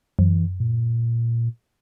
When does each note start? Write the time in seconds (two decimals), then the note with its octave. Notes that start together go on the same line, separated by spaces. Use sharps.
0.19 F#2 E3
0.60 A#2